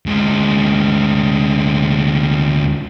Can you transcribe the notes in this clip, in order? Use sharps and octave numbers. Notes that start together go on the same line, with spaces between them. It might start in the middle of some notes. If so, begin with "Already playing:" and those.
D2 G#3